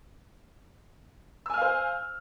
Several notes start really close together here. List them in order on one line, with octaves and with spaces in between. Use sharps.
E6 G#5 F6 F5 C5